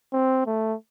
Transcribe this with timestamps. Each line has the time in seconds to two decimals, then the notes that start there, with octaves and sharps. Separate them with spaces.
0.13 C4
0.47 A3